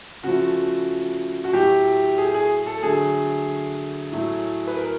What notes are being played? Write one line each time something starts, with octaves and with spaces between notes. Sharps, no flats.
C#3 F3 A3 F#4
F#4
A2 F#3 A3 G4
G#4
G#4
A4
D3 F#3 A3 G#4
A2 F#3 A3
B4
A#4